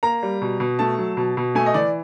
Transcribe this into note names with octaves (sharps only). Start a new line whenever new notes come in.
A#3 A#5
G3
B2
B2
A3 A5
F#3
B2
B2
A3 G#5
D#5
E3 D5